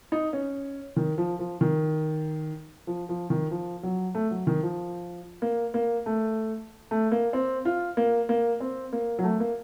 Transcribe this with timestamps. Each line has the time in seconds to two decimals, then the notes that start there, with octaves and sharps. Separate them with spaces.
0.12 D#4
0.33 C#4
0.96 D#3
1.18 F3
1.39 F3
1.61 D#3
2.87 F3
3.09 F3
3.30 D#3
3.51 F3
3.83 F#3
4.15 A3
4.31 F#3
4.47 D#3
4.63 F3
5.42 A#3
5.74 A#3
6.06 A3
6.91 A3
7.12 A#3
7.33 C4
7.65 F4
7.97 A#3
8.29 A#3
8.60 C4
8.93 A#3
9.19 F#3
9.24 A3
9.40 A#3